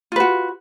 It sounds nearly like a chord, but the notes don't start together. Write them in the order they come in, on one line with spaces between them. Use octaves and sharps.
F4 B4 F#4